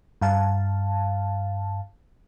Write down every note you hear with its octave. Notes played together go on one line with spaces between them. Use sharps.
G2 F5 A5